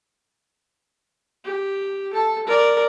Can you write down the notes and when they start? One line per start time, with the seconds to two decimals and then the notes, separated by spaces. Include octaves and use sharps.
1.44 G4
2.13 A4 A5
2.47 A#4 D5